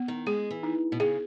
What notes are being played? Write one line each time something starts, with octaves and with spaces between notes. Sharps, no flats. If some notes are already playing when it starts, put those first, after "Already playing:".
Already playing: B3
D#3
G#3 G#4
E3
D#4
B2
C#3 G#4